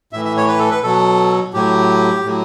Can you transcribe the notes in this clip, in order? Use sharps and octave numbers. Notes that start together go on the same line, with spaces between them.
A2 E3 E5
E5
C#5
B4
A4
B4
B2 F#3 A4
A2 F#3 G4
A2 F#3